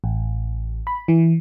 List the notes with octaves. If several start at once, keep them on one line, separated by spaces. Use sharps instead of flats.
A1
B5
E3